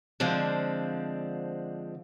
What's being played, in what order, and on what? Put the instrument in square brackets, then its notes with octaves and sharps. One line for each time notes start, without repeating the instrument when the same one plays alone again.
[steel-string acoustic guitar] D3 F3 G#3 C4 D4